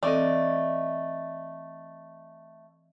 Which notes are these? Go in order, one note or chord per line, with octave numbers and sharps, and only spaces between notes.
E3 A3 C4 A4 D5 D#5